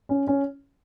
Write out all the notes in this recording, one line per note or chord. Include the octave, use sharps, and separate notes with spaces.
C#4
C#4